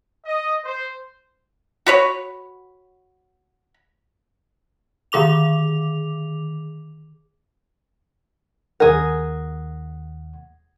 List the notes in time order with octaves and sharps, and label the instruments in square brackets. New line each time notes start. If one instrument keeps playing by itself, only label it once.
[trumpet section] D#5
C5
[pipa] F#4 B4 C#5
[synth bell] D3 D#3 G#4 D6 F7
[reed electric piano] D#2 F#5 [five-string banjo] G#4 A#4